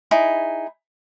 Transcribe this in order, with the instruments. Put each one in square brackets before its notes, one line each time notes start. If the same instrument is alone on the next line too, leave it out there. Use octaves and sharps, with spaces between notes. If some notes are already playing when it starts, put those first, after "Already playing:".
[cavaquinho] D#4 E4 G#4